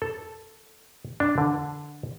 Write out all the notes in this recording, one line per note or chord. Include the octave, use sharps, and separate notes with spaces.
A4
D4
D3